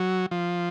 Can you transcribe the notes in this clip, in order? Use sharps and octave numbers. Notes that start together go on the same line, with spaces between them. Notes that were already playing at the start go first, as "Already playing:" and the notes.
Already playing: F#3
F3